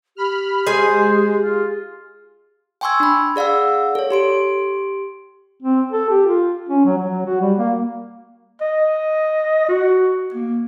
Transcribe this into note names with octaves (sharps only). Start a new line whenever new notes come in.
G4 B5 F6
G#3 G#4 C5 G#5
F4
G5 G#5 C6 C#6 E6 G#6
D4 B5
G#4 D5 F5 F#5 E6
A4 C#5
G4 C6 D7
C4
A4
G4
F4
C#4
F#3
F#3
F#4
G3
A#3
D#5
F#4
A#3